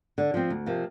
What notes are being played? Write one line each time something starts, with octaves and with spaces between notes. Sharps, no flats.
D3
F3 C4
D2
C3 F3 A#3